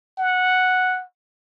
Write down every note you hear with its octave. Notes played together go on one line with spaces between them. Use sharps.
F#5